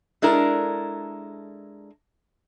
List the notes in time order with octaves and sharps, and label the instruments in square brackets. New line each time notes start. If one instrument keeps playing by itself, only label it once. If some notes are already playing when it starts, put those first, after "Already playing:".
[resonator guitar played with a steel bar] G#3 D4 E4 A4 A#4